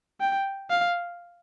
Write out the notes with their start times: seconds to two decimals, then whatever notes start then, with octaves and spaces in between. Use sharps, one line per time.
0.21 G5
0.70 F5